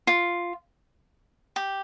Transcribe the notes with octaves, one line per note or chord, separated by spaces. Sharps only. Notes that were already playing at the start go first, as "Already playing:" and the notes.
F4
G4